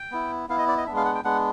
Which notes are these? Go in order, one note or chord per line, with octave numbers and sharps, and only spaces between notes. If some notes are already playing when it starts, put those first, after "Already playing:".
Already playing: G5
B3 E4
B3 E4 F5
D#5
D5
D#5
G#3 B3 D4 E5
F5
F#5
G5
G#3 B3 D4 F#5